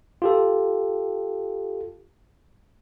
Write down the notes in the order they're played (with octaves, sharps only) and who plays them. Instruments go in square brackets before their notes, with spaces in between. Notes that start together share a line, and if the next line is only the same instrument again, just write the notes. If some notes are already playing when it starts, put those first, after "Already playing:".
[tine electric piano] F4 G4 A4